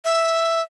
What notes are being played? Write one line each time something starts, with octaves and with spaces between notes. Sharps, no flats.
E5